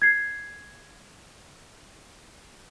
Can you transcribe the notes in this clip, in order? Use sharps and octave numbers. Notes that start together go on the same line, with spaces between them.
G#6 C7